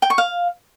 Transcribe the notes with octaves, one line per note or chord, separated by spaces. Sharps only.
G5
C#6
F5